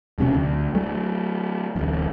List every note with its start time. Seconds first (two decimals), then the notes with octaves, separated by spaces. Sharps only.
0.18 E1 C3 F#3 C#4
0.34 D2
0.75 F#3 A3
1.76 D1 A1